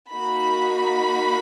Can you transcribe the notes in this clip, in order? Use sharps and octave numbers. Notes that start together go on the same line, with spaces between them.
A#3 D#4 F#4 B5